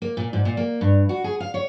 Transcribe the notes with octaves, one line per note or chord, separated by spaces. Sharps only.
A#3
A#2
G#2
A#2
A#3
G2
F#4
G#4
F5
C#5